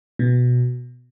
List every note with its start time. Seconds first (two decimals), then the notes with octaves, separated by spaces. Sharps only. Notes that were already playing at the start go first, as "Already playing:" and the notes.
0.19 B2